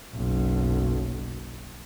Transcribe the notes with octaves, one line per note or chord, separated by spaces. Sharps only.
F#1 B1